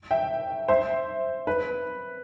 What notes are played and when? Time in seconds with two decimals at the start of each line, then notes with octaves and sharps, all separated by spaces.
0.11 E5 G5
0.68 C5 E5
1.47 B4